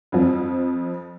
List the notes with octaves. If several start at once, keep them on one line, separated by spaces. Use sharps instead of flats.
F2 F3